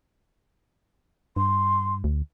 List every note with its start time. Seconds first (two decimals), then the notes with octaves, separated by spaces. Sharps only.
1.36 G2 C6
2.04 D2